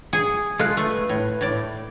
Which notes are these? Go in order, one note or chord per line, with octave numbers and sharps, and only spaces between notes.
G#4
G#3 F4 A4 F#6
A3 B4
A2
A2 D5